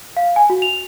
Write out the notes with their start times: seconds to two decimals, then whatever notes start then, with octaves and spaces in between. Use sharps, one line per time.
0.17 F5
0.36 G#5
0.50 F#4
0.62 F7